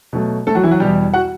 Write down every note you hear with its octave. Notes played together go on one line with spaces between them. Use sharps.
B2 F#3 A3
A3 A4
F#3 F#4
E3 E4
F#3 F#4
E2 B2 G3 G4
F#4 F#5